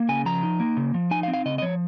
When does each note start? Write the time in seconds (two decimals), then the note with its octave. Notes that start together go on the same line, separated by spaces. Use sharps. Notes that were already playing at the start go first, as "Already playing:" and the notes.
Already playing: A#3
0.09 C#3 G#5
0.26 F3 A#5
0.43 D#4
0.60 A#3
0.77 C#3
0.94 F3
1.11 D#4 G#5
1.23 F5
1.28 C4
1.34 F5
1.45 C#3 D#5
1.58 D#5
1.62 F3 C#5